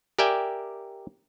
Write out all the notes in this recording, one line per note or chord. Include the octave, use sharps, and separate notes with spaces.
G4 A#4 D5 E5 G5 G#5